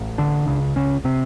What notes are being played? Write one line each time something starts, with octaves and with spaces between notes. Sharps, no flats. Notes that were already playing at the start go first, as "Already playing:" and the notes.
Already playing: A1 A2
D3 D4
C#2 C#3
C#3 C#4
C3 C4